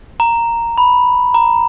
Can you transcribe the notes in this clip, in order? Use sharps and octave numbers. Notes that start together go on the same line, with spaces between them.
A#5
B5
A#5